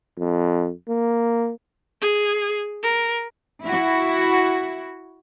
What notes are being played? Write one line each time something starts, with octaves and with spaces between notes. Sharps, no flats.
F2
A#3
G#4
A#4
E4 F#4